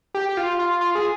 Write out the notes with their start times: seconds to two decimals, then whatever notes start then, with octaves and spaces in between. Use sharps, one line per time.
0.14 G4
0.29 G4
0.37 F4
0.59 F4
0.81 F4
0.95 G#4